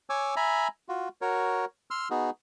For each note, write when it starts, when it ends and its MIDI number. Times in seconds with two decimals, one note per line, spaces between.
0.10 0.35 73
0.10 0.35 80
0.10 0.35 86
0.10 0.35 88
0.36 0.68 76
0.36 0.68 80
0.36 0.68 82
0.36 0.68 83
0.89 1.08 65
0.89 1.08 66
1.21 1.65 66
1.21 1.65 70
1.21 1.65 73
1.91 2.08 84
1.91 2.08 88
1.91 2.08 89
2.11 2.30 59
2.11 2.30 63
2.11 2.30 66
2.11 2.30 68